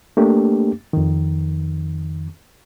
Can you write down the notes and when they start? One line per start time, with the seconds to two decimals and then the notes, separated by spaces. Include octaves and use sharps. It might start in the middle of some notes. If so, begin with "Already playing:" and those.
0.17 A3 A#3 D4 G4
0.93 F2 D#3